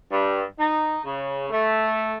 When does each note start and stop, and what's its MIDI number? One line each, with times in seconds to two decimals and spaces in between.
0.11 0.41 43
0.58 0.98 63
1.04 1.50 49
1.50 2.15 57